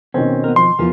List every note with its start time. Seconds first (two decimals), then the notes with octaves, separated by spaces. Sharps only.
0.14 B2 D#3 C4 C#4
0.44 B3 A#4
0.56 F3 C6
0.79 E2 F3 F4 A#4